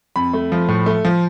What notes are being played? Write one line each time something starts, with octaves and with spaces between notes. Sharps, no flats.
F2 B5
A3
F3
A2
A3
F3